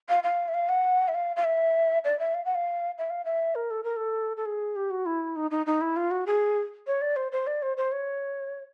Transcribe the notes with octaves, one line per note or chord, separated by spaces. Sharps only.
F5
F5
E5
F5
F#5
E5
F5
F5
E5
D5
E5
F5
F#5
F5
E5
F5
E5
A#4
A4
A#4
A4
A4
G#4
G4
F#4
E4
D#4
D#4
D#4
E4
F4
F#4
G#4
C#5
D5
C5
C5
D5
C5
C5
C#5